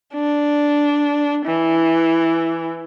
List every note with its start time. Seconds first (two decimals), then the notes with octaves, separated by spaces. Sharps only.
0.14 D4
1.45 E3